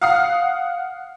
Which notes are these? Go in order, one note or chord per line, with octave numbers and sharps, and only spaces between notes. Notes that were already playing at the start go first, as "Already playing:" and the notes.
F5 F#5 D#6 F6 C7